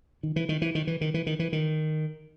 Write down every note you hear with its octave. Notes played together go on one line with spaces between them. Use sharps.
D#3
E3
D#3
E3
D#3
E3
D#3
E3
D#3
E3
D#3